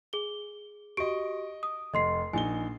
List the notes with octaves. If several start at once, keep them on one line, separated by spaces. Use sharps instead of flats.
G#4 G7
F#4 G4 D#5 C#6 D7
D#6
F1 D#5 C6 C7
A#1 D#4 G#5 G7